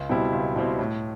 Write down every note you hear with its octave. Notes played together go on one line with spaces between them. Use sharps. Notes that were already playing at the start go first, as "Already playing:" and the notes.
Already playing: C#2
B2 G3 C4 E4
C#2
B2 G3 C4 E4
A2